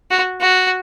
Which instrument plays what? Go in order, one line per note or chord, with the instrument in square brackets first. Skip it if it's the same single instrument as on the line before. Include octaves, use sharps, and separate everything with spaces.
[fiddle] F#4
F#4